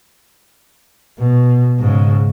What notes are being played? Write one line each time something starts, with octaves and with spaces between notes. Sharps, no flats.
B2
G#2 C#3